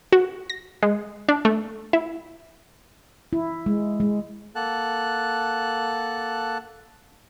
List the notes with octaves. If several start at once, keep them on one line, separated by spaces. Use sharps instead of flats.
F#4
A#6
G#3
D4
A3
E4
E4
G#3
G#3
A#3 A4 F#5 A5 F#6